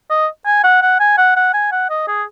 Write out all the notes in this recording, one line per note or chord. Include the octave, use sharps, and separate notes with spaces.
D#5
G#5
F#5
F#5
G#5
F#5
F#5
G#5
F#5
D#5
G#4